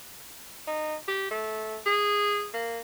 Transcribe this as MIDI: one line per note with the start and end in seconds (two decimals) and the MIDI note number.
0.67 0.96 63
1.08 1.29 67
1.31 1.77 57
1.86 2.47 68
2.53 2.80 58